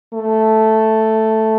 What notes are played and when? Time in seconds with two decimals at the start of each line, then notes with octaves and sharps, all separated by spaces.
0.13 A3